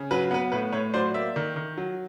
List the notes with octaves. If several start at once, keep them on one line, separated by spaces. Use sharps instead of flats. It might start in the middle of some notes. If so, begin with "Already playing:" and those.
Already playing: C#3
F#3 B4
B3 B4
A2 B4
A2 B4 C#5
F#3 C5 D5
A#3 D5 E5
D#3
D#3
F#3